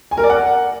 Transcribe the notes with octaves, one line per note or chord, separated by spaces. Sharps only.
G#5
A#4
D5
F#5